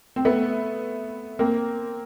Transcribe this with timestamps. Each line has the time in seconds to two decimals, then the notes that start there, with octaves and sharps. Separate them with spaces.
0.16 C4
0.25 A3 B3
1.39 A#3 C4